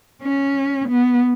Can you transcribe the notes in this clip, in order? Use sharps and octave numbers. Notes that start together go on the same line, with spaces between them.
C#4
B3